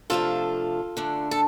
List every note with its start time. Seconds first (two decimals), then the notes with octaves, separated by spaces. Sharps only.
0.10 C3 F3 A3 D4 F4 A4
0.97 D3 A3 D4
1.31 A4